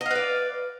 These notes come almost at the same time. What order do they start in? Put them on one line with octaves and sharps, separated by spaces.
D#5 F5 B4 D5